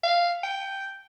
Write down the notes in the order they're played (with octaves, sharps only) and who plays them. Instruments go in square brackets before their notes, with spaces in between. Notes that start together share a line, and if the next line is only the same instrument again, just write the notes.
[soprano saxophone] F5
G5